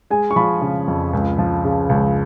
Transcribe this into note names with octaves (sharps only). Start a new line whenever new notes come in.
G#3 G#5
C#6
F3 B5
C#3
F2
C#2
F3
C#3
C#2